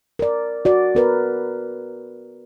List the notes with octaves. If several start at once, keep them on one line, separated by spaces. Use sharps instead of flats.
A#4 D5
F#4 D5
B3 A#4 B4